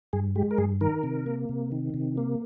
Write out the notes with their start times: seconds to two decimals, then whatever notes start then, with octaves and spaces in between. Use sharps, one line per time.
0.13 G2 G#4
0.35 G#3 G4
0.51 A#4
0.58 G2 G#4
0.81 D#3 A#4
1.03 C3
1.26 A#3
1.49 C3
1.72 D#3
1.94 C3
2.17 A#3